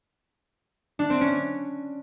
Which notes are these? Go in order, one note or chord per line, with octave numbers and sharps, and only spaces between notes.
D4
C4
C#4